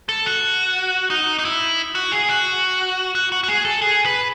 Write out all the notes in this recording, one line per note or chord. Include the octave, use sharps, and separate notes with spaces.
A4
F#4
D#4
D#4
E4
F#4
G#4
F#4
F#4
F#4
F#4
G#4
A4
G#4
B4